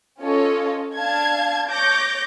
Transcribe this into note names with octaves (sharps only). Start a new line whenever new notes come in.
C#4 F4 A4 C#5 D#5
D4 F5 A5 G#6
C#5 D6 G6 A#6